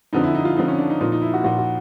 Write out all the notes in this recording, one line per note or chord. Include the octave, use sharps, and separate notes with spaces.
F2 D3 F3 D#4
E4
D#4
F4
F2 D3 F3 D#4
C#4
D4
D#4
A#2 F3 D#4
D#4
E4
F#4
A#2 F3 F#4
F#4